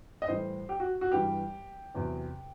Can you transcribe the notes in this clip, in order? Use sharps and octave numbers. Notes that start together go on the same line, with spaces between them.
D#5
A2 E3 G3 C5
G4
F#4
F#4
G2 E3 G3 G4
E2 C3 F#3